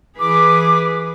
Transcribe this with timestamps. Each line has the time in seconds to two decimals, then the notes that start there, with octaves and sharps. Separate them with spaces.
0.18 E3 G#4 B4 D6